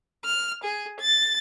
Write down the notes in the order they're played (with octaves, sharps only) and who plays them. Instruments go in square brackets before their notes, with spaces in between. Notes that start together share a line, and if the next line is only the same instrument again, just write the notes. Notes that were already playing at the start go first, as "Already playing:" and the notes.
[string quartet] F6
G#4
A6